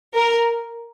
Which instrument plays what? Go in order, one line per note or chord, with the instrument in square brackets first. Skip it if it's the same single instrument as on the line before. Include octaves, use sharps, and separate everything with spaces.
[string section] A#4